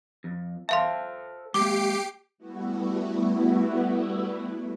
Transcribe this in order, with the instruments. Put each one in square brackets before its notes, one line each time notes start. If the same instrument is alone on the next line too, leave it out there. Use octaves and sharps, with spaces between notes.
[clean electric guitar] F2
[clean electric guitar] A4 C5 A5 [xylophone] E5 F5 C6
[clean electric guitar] G#3 A#3 [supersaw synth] G4 C7 D7 [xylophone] D6
[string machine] G3 A3 B3 E4 F#4